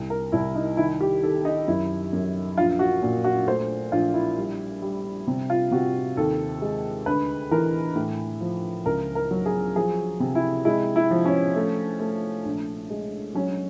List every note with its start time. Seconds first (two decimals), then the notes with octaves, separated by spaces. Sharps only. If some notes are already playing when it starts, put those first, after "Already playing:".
Already playing: C2
0.10 A#4
0.32 C2 E4
0.55 D#4
0.77 D#3 E4
1.01 G4
1.22 D#3 A4
1.45 D#4
1.68 F#2 E4
2.13 F#2
2.57 A#1 F4
2.79 F#4
3.02 A#2
3.24 F#4
3.47 A3 C5
3.92 A#1 F4
4.14 E4
4.37 G3
4.82 G3
5.27 C3
5.50 F4
5.71 C3 F#4
6.17 D#2 A4
6.62 G#3
7.06 D2 B4
7.51 E3 A#4
7.96 A2
8.41 F3
8.86 C#2 A#4
9.15 A#4
9.31 F#3
9.46 G#4
9.76 F3 G#4
10.20 C3
10.35 E4
10.65 G#3 E4
10.96 E4
11.11 F3
11.25 C#4
11.56 A3
12.00 A3
12.45 A#1
12.90 G#3
13.34 F#3 C#4